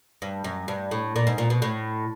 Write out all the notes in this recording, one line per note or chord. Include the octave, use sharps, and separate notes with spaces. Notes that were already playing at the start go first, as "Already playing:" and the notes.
G2
F#2
G2
A2
A#2
G#2
A#2
B2
A2